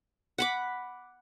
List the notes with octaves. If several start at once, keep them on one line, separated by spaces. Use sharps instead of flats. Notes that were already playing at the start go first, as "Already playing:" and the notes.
F#5 B5 D6